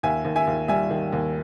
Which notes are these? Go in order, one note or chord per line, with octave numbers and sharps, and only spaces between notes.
D#2 E5 G#5
D#2
E5 G#5
D#2
G3 E5 G#5
D#3
D#2